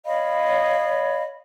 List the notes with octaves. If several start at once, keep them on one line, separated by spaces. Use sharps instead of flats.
C#5 D#5 F5 B5